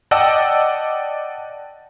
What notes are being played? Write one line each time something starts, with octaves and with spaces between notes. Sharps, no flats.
D5 D#5 F#5 G5 A5 E6